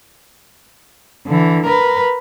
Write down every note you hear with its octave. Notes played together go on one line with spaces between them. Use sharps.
D3 E3
A#4 B4